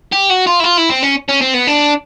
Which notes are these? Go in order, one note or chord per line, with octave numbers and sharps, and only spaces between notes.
G4
F#4
F4
E4
F4
E4
C4
C#4
C#4
C4
B3
D4